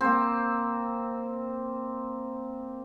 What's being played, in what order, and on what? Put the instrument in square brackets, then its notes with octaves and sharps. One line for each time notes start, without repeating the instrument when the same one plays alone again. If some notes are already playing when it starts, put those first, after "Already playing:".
[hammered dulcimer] A#3 C4